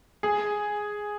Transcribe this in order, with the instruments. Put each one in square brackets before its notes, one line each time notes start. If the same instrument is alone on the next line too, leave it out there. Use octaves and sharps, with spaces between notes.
[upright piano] G#4